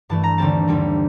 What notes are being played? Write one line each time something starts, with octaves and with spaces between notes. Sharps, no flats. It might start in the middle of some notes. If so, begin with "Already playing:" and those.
G2 E3 A3 A5
A#5
D#2 D3 G3 C4 A5
D#2 D3 G3 C4